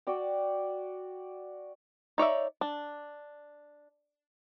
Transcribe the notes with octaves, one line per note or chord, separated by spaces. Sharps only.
F#4 D5 G5
D#4 C#5 D5 E5
D4